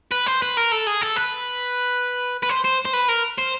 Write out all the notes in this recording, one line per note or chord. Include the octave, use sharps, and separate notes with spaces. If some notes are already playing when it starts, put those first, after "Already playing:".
B4
C5
B4
A#4
A4
G#4
A4
B4
B4
C5
C5
C5
B4
A#4
C5